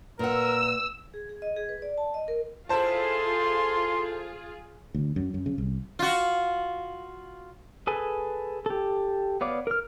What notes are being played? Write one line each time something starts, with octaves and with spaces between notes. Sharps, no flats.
A#2 A#4 B4 F#5 E6
G#4
G#4
D#5
G#4
B4
D5
A5
D#5
A#4
A2 E4 F4 G#4 A4 C5 A5 C6
D2
F#2
F#2
C#3
C2
F4 F#4
G#4 A4 B4 G#5
G4 A4
B3 C#5 D5 F5 D6
A#4 F6